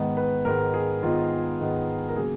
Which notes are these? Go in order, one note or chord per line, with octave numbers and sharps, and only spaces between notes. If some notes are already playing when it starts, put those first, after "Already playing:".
Already playing: G#2 D#3 G#3 B3
B4
G#2 D#3 G#3 B3 A#4
G#4
G#2 D#3 G#3 B3 F4
G#2 D#3 G#3 B3
A#4
C#3 F#3 A#3 G#4